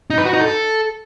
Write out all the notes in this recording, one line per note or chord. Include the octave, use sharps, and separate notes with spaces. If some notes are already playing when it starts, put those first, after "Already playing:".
D#4
B4
F#4
D#4
A4